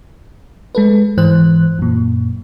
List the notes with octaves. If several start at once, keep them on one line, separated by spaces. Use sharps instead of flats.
G#3 A4 B4
G#2 E3 C5 F#6
F#2 A#2